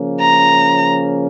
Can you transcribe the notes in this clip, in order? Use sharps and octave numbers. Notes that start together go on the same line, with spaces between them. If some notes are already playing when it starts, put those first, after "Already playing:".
Already playing: C#3 F3 A#3 C#4
A#5